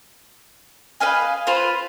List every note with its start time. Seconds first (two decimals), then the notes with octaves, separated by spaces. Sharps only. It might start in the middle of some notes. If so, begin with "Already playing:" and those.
1.00 B4 D#5 F5 G#5
1.47 F4 B4 C5